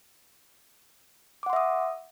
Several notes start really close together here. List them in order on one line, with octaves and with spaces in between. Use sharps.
D6 F#5 C6 E5 D#6